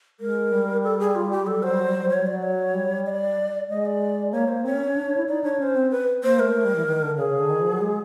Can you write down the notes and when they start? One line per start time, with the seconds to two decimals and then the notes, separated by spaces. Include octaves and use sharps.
0.20 G#3 A#4
0.52 G3
0.84 A4
1.00 G#4
1.15 F4
1.31 G4
1.47 F#3 A4
1.56 G3
1.63 F#3 C5
1.71 G3
1.80 F#3
1.88 G3
1.96 F#3
2.04 G3
2.10 F#3 C#5
2.21 G3
2.27 F#3 D5
2.43 C#5
2.74 G3
3.06 D#5
3.09 D5
3.69 G#3 D#5
3.86 D5
4.32 A#3 C#5
4.48 A#3 C5
4.65 C4 C#5
4.75 C#4
4.86 C#4
4.96 D4
5.06 D4
5.17 E4
5.28 D#4 D5
5.44 D4 C#5
5.59 C#4 C5 C#5
5.75 C4
5.91 B4
6.23 A#3 C5
6.39 A3 A#4
6.55 A3
6.65 G3
6.76 E3
6.86 D#3
7.03 D3
7.18 C#3 G#4
7.29 C#3
7.39 D3
7.50 D#3
7.61 F3
7.71 F#3
7.81 G#3